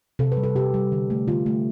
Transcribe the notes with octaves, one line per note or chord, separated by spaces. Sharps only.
C3 A4
B4
G3
A4
C3 G4
G3
D3
A3
D3 F4
A3